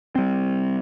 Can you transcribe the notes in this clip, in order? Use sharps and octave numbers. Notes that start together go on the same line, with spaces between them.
G3 C4